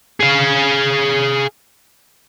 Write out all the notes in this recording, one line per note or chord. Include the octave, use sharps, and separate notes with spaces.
G#4 F5